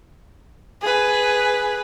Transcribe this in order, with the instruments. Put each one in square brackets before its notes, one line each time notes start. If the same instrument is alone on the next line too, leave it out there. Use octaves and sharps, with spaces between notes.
[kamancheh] G#4 B4